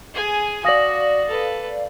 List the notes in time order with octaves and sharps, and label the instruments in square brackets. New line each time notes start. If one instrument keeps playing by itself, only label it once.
[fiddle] G#4 G#5
[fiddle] F#4 [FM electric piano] D5 F5 [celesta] D#6 A#6 F#7
[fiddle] A4 B4